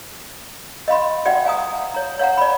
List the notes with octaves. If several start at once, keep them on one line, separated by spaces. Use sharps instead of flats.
D#5 F5 B5 C6
F#4 D5 E5 F#5 G5
F5 G#5 A#5 D#6
C#5 A#5
C#5 F5 F#5 A#5
D5 B5